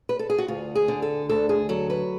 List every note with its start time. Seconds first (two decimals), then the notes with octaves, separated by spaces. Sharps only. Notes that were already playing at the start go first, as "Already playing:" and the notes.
0.09 B4
0.19 A4
0.30 G#4
0.38 F#4
0.48 D2 F4
0.75 G#4
0.88 D3
1.02 A4
1.29 D2 A4
1.49 G#4
1.69 F#3 A4
1.90 B4